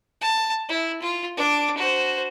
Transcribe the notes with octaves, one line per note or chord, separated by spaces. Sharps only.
A5
E4
F4
D4 D6
F#4 C5